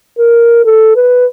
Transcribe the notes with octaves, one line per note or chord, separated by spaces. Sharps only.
A#4
A4
B4